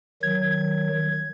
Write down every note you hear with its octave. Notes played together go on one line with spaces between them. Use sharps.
D#3 F#3 G#6